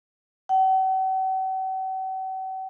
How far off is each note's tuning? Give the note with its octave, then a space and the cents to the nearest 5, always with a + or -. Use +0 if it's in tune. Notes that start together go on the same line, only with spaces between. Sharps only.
F#5 +45